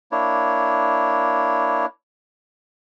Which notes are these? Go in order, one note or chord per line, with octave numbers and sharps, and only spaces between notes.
A#3 D4 E4 C#5